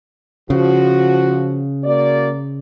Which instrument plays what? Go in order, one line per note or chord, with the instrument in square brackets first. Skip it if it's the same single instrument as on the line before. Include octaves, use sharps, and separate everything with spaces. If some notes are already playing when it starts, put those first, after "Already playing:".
[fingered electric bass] C#3 [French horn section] F3 F#4
[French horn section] A#3 F#4 D5